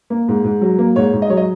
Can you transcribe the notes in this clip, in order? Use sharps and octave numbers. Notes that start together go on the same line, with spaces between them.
A#3
G#2
G#2
F#3
A#3
G#2 C#5
G#2
D#5
F#3 C#5
D#5